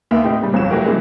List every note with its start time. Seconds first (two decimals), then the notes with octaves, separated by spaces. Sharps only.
0.11 D#2 A#3 B3 A#4 E5
0.24 A2 C4 G4 D#5
0.42 A#2 C#3 G3
0.53 G1 F2 F#3 C#4 E7
0.70 E3 F#3 A3 F#4 G4 A#4
0.85 G2 C#3 E3 F3 G#3 A#3